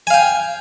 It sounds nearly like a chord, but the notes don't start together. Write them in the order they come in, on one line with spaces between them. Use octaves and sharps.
G#5 F5 G5